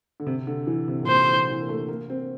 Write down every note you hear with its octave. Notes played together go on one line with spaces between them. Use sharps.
D3
C3
D3
E3
C3
A#2
C3 C5
E3
E3
A#3
A3
A#3
C4